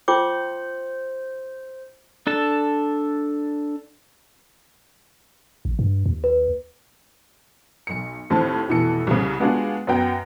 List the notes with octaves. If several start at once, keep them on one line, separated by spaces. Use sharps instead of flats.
F4 C5 G5 D6
D4 A4 A5
A1
G2
D#2
B4
B1 C#7
D#2 A2 C4 A5
F1 B2 E3 A4 C#7
C2 C#3
G#3 B3 D4 F4 F#4 G#4
F#2 F#3 B3 G5 A#6